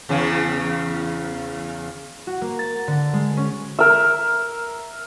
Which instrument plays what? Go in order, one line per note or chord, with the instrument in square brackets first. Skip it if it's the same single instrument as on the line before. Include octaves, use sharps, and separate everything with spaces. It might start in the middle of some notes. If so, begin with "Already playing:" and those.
[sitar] E2 C#3 C#4
[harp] F#4
A#3
A6
D3
G#3
C#4
[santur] A#4 E5